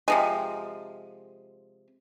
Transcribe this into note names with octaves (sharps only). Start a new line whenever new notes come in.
C3 F3 G#3